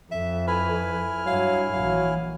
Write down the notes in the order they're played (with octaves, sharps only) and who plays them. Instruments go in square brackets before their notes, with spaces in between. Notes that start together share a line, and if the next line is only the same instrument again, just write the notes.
[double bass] F2 [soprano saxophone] E5
[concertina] E4 G#5 F6 [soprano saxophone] B4
[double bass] G2 [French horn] F#3 [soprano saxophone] F5
[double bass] A#1 E3 [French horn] F#3 [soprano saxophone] F5